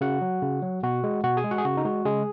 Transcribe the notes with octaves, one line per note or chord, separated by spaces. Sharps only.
C#3 F#4 F#5
F#3
C#3
F#3
B2 F#4 F#5
G#3
B2 F#4 F#5
G#4 G#5
G#3
F#4 F#5
G#4
C#3 F#4
D#4
G#3 F#4
C#3 G#3 G#4